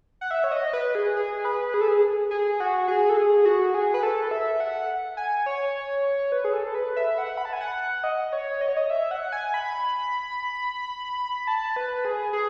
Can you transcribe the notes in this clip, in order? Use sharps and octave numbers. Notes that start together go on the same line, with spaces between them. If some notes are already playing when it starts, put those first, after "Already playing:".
F#5
E5
C#5
D#5
B4
G#4
G#4
B4
G#4
A4
G#4
G#4
F#4
G#4
A4
G#4
F#4
G#4
B4
A4
E5
F#5
G#5
C#5
B4
G#4
A4
B4
E5
F#5
B5
A5
G#5
F#5
D#5
C#5
D#5
C#5
D#5
E5
F#5
G#5
B5
A5
B4
G#4
G#4